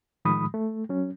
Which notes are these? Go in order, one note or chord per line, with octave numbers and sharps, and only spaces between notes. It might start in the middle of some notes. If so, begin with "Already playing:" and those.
A2 D#3 F3 G#3 B5 D#6
A3
F#3 C#4